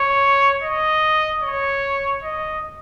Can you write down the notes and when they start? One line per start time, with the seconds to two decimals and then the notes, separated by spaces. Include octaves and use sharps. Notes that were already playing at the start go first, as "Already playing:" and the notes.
Already playing: C#5
0.63 D#5
1.42 C#5
2.23 D#5